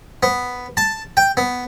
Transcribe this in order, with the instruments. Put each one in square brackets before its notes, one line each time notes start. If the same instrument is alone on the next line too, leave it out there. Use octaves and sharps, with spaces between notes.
[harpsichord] B3
A5
G5
B3